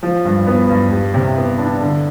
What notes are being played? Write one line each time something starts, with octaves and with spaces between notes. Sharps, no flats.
F3
G2
B3
G2
G3
C3
B3
D4
D3